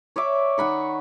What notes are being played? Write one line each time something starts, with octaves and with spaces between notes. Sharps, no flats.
C#5 D5 E5 D6
D#3 F#5 B5 C#6